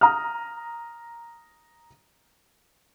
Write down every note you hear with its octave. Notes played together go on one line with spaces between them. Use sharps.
A#5 D#6 F6